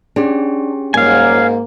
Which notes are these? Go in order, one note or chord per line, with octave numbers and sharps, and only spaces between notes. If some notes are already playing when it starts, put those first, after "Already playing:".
C#4 D4 G4 G#4
G#2 F#3 G3 A#3 F5 G#5